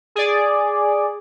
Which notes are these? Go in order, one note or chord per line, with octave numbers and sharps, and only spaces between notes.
G#4 D5